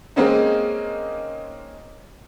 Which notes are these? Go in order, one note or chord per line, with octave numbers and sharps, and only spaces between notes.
G#3 A#3 C4 C#4 D#4